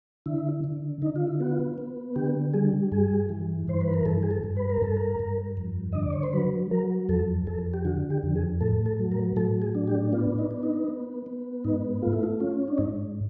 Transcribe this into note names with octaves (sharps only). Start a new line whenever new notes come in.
D3 E4
D3
D3 D#4
F4
E4
B3 F#4
F4
B3
D3 G4
G3 G#4
G2 G#4
E3
G2 C5
B4
A#4
G2 A4
G#4
A4
G2
B4
A#4
G2 A4
A#4
G2
F2
D3 D#5
D5
C#5
C5
F#3 B4
F#3 A#4
F2 A4
F2 A4
G4
D3 F#4
G4
F2
G#4
A2 A4
A4
F#3
A#4
A2 A4
G#4
D4
G4
B3 F4
D#4
B3
D#4
B3
B3
G#2 D#4
A3 F4
E4
F4
C#4 F4
D4
G#2 D#4